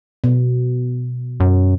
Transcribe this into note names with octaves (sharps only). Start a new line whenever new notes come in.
B2
F#2